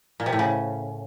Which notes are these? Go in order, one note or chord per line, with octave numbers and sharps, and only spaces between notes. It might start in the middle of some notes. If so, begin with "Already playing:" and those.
A#2
C3
A2
C#3